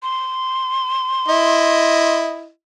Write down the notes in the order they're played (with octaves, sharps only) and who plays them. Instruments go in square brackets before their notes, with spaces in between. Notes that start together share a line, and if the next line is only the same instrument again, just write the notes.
[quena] C6
[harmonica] E4 D#5